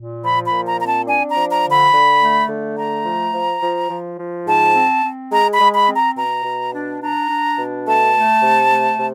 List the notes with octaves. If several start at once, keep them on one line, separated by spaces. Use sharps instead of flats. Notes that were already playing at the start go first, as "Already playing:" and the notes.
Already playing: A#2
F3 B5
B5
A#2
A#5
C4 A#5
A5
D4 G#5
A#5
F3
A#5
D3
B5
D3
A3
D3
A3 A#5
F3
F3
F3
F3
F3
G#2 A5
C4
C4
G#3 A#5
B5
G#3
B5
C4
A#5
B2 A#5
B2
D4
D4 A#5
D4
B2
A3 A5
A3
C3
A3
C3